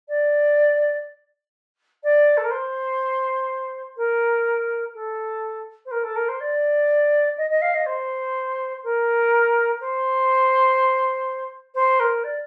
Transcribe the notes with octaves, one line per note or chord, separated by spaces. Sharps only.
D5
D5
A4
A#4
C5
A#4
A4
C5
A#4
A4
A#4
C5
D5
D#5
D#5
F5
D#5
C5
A#4
C5
C5
A#4
D5